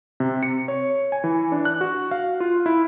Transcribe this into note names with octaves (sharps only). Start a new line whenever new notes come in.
C3
C#7
C#5
G#5
E3
D4
F#6
F#4
F5
F4
E4